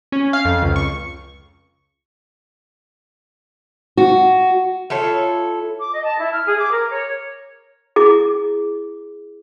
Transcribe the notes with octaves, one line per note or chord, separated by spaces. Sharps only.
C#4
F5
F2
C#2
C#6
F#4
E4 F4 A4 C#5
D6
D#5
A5
E4
F6
G#4
D6
A#4
C#5
E4 G#4 D6